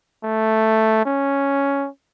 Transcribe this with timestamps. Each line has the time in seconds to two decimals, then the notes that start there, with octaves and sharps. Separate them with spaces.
0.24 A3
1.05 C#4